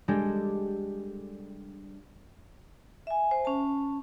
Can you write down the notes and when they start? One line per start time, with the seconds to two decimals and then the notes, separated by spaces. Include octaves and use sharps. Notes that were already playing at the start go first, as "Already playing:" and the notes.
0.08 G3 G#3 D4 G4 A4
3.07 E5 G#5
3.31 C5
3.45 C#4 A5